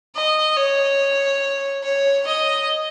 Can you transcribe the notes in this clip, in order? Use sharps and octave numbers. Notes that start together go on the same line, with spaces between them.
D#5
C#5
C#5
D#5